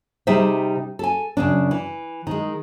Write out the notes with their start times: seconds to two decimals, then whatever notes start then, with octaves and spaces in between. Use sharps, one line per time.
0.27 C3 G3 D#4 G#4 C5 E5
0.99 A4 G#5
1.37 F#2 C#3 D4
1.71 E3
2.27 D#3 G#3